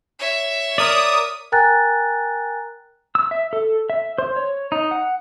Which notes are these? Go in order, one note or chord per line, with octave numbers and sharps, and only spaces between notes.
C#5 E5
A#4 D5 D#6
A#4 G5 G#5 A#5 F#6 A6
E6
E5
A4
E5
C5
C#5
D#4
F#5